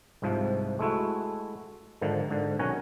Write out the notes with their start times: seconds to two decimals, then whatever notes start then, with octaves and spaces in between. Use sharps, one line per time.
0.22 C2 G#2 C3 F3
0.79 G#3 A3 E4 F#4
2.01 G#2 D3 D#3 F3
2.30 G#2 D3
2.59 B1 D#3 C#4 F#5 G#5 A#5